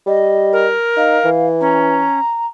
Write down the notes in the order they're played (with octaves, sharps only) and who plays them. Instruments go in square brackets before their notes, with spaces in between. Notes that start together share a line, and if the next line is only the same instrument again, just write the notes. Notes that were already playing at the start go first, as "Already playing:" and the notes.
[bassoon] G3 [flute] D#5
[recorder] A#4
[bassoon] D#4 [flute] F5
[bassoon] E3
[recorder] C#4 [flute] A#5